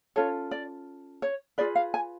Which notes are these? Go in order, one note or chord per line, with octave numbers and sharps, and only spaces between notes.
C#4 F4 A4 C#5
D5
C#5
F4 G#4 B4 D5
F5
G#5